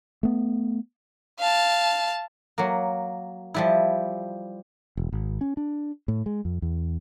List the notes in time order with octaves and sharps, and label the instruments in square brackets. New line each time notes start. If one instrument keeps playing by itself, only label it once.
[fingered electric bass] A3 B3
[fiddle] F5 A5
[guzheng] F#3 A#3
F3 G3 E4
[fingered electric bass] E1
G#1
C#4
D4
A2
G#3
F2
E2